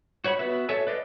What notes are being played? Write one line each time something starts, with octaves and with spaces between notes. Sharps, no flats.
F#4 C#5 F#5 B5
B3 F#4 B4 E5
A4 C#5 E5 G#5
B4 D5 D#5 F5